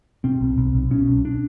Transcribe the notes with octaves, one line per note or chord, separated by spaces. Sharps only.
B2 C4
B1
B1
B1
B2 C#4
B1
D4